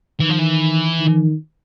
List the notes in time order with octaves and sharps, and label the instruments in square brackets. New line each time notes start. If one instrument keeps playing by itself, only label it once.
[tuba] D#3 [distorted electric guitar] E3
[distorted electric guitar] F3
E3
[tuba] D#3